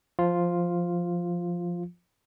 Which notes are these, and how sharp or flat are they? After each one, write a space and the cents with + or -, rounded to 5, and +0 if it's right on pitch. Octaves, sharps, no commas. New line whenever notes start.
F3 +0 F4 +0